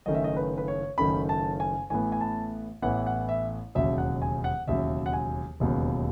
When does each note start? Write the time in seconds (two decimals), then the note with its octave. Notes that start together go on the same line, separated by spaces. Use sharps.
0.06 F#1 F#2 D#3 A3 C#4 D#5
0.14 E5
0.24 D#5
0.37 B4
0.58 B4
0.68 C#5
0.98 F#1 F#2 D#3 A3 C#4 B5
1.29 A5
1.60 G#5
1.90 A1 A2 E3 B3 G#5
2.12 G#5
2.21 A5
2.82 A1 A2 E3 B3 F#5
3.06 F#5
3.29 E5
3.75 E1 D#2 C#3 F#3 E5
3.98 F#5
4.22 G#5
4.44 F#5
4.67 E1 D#2 C#3 F#3 E5
5.06 F#5
5.13 G#5
5.60 E1 D#2 C#3 F#3 B3